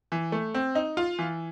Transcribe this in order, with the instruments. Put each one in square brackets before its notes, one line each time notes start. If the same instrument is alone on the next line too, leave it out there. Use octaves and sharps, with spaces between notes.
[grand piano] E3
A3
C4
D#4
F4
E3